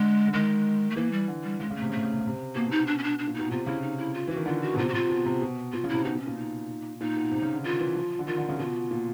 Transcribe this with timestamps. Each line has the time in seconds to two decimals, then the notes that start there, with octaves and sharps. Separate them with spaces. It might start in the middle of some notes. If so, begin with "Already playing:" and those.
Already playing: D3 G#3
0.27 D3
0.33 D#3 G#3
0.90 A3
0.96 E3 A#3
1.12 G3
1.28 D3
1.44 G3
1.60 C#3 G#3
1.70 C#3
1.76 A3
1.81 C3
1.89 C#3 A3
1.97 C3
2.04 C#3
2.13 C3
2.20 C#3
2.27 C3
2.55 B2 A#3
2.67 B2
2.71 D#4
2.77 B2
2.87 D4
2.98 C#4
3.04 D4
3.19 D4
3.27 A#2
3.35 B2 D#4
3.51 C3 F4
3.66 C#3 E4
3.82 D#4
3.98 E4
4.14 F4
4.28 E3 F#4
4.36 D#3
4.46 D3 F4
4.62 F#4
4.74 B2
4.77 C3 F4
4.89 F#4
4.94 C3 F4
5.10 B2
5.26 C3
5.42 B2
5.73 B2 F4
5.84 C#3
5.89 C3 E4
6.05 B2 D#4
6.16 B2
6.20 C#4
6.27 A#2
6.37 D#4
7.00 A#2 D#4
7.17 B2
7.31 C3
7.42 C#3
7.54 D3
7.64 D#3 F4
7.80 E3
7.95 F3
8.19 D3
8.27 D#3 F4
8.38 D3
8.49 C#3
8.59 B2 F4
8.91 A#2